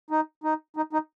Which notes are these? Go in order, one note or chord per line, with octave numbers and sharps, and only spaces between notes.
D#4
D#4
D#4
D#4